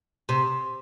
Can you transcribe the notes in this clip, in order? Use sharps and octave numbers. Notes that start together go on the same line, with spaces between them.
C3